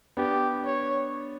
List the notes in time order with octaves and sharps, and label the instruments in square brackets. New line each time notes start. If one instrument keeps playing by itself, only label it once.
[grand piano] B3 D4 [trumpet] G4
[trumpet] C#5